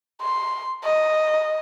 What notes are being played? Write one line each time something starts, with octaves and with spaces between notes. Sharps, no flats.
C6
D#5